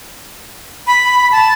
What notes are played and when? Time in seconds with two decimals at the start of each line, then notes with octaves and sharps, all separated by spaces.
0.87 B5
1.32 A5